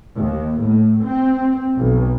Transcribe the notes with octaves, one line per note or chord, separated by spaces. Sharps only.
D#2
A2
C4
B1